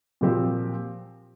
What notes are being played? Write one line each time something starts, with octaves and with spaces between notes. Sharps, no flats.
A#2 F3 C4 G4